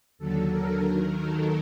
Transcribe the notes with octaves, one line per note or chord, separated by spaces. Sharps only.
D#2 D3 F#3 A4
A#4
D#2 D#3 F#3
A4